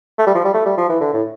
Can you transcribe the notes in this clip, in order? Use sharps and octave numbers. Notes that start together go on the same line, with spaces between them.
A3
G3
F3
G3
A3
G3
F3
E3
D3
A2